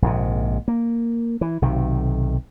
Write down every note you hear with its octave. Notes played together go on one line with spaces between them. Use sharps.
A#1 G#2 C3
A#3
E3
B1 C3 D#3